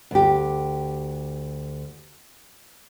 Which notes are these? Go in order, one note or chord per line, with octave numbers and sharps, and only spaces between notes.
D2 G4